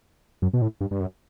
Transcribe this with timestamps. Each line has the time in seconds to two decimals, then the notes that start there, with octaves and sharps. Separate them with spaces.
0.42 F#2
0.53 B2
0.62 A2
0.81 G2
0.91 G2
1.00 F#2